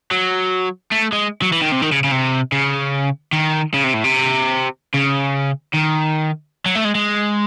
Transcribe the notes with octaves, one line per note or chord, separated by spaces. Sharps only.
F#3
A3
G#3
F#3
E3
D#3
C3
D#3
C#3
C#3
C3
C#3
D#3
C#3
C3
A2
C3
C#3
D#3
F#3
A3
G#3
G#3